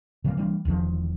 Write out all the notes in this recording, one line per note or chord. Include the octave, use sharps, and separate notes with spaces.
C3 E3 G3 A#3
E3 G3 A#3 D4
E1 E2 D#3 F3